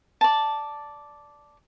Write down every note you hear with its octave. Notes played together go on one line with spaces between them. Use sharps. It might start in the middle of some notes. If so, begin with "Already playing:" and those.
D5 A5